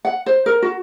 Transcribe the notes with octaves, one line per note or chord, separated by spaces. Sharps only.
F#5
C5
A#4
F#4